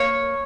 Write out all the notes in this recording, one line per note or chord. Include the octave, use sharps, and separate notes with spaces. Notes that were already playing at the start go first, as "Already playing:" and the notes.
Already playing: A#3 C#5